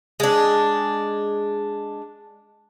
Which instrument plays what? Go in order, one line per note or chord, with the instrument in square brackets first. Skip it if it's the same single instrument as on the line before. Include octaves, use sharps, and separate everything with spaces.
[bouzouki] G#3 D4